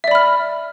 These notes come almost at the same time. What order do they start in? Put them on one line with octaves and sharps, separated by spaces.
E5 D5 B5 F6